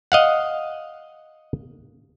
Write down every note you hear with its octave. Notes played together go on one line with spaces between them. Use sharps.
D#5 F5 F#5